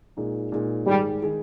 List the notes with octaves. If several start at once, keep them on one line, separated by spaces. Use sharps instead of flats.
A#2 G#3 D#4 G#4
A#2 G#3 D#4 G#4
G#2 D#3 G3 G#3 D#4 G#4
D#3 G#3 D#4 G#4